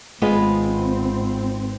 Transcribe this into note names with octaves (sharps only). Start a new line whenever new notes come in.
G#1 G#3 B3 C4 F4